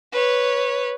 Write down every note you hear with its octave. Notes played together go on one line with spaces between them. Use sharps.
B4 C#5